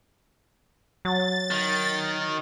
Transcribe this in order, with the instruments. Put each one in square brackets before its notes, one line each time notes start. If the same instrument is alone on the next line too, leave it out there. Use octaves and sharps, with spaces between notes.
[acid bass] F#3 [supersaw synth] A6
[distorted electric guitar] D#3